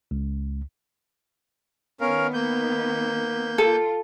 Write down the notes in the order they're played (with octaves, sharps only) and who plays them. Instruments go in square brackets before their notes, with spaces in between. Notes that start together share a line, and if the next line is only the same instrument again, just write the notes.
[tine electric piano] C#2
[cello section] D#3 B3 [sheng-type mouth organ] C#4 A#4 F5
[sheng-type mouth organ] A#3 G6
[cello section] F4 [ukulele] A4